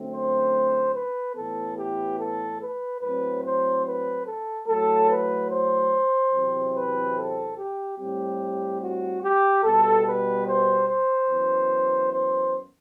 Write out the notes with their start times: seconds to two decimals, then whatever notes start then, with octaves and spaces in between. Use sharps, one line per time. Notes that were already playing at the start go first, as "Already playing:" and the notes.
Already playing: F#2 D3 A3 C4
0.12 C5
0.95 B4
1.36 A2 E3 B3 A4
1.77 G4
2.19 A4
2.60 B4
3.02 A2 F#3 C4 B4
3.43 C5
3.86 B4
4.26 A4
4.68 A2 F#3 A3 A4
5.09 B4
5.50 C5
6.33 E2 C3 F#3 C4
6.75 B4
7.16 A4
7.58 G4
7.99 A2 G3 C4 G4
8.82 F#4
9.23 G4
9.64 B2 G3 B3 A4
10.06 B4
10.47 C5
10.89 C5
11.30 F#2 E3 B3
12.13 C5